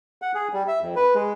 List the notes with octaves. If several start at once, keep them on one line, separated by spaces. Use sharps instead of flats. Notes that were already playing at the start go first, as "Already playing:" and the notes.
F#5
G#4
G3
E5
F2
B4
G#3